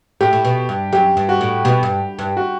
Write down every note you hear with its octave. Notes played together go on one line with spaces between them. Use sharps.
A2 G4
A2
B2
G2
F#2 G4
G2
F#4
A2
B2 G4
G2
G2
F#4